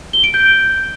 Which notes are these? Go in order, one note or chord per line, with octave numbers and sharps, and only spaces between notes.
G7
D7
G6